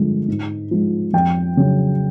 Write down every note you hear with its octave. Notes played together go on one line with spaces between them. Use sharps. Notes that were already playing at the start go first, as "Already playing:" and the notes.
Already playing: G2 D3 F3 G#3
G#2
F3 G#3
F2 G5
C#3 F#3